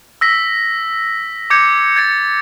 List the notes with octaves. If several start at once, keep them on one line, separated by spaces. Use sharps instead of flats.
E6 A#6 B6
D6 G6 G#6 C#7
G#6 A6 C#7